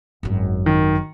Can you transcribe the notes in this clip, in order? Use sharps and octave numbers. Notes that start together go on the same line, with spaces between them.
G#1 F#2
D#3